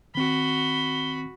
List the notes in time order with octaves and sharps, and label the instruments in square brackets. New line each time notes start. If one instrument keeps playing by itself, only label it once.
[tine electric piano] D#3 C4 [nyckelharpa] F#4 B5 [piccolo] G7